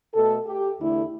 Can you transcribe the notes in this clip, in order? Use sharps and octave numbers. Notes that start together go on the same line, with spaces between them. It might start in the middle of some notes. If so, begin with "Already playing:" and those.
B2 A3 A4
G4
E2 D3 A3 E4